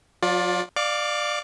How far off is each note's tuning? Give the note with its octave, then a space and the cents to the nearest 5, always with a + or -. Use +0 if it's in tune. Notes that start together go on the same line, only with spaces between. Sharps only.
F#3 -40 F4 +25 D5 +0
D5 +20 F5 +10 D6 -25